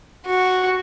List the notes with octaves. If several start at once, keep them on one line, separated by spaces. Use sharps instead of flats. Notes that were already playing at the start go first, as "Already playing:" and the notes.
F#4